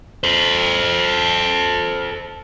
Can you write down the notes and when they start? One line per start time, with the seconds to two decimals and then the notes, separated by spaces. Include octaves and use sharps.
0.24 A4 C5